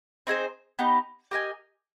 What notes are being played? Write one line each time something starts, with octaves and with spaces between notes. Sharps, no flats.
C4 D#4 G#4 C5
B3 D#4 G4
G4 A#4 D#5 G#5